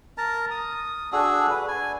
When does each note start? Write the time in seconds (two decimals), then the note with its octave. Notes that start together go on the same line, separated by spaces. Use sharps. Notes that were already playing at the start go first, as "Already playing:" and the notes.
0.18 A#4 A5 A#5
0.51 D#6
1.12 D4 F#4 G#4 A4
1.50 B4
1.68 G#5